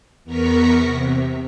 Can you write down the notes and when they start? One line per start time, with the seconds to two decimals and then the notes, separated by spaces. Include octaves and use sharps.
0.24 E2 B3 A#4 A#5 C#6 B6
0.79 C3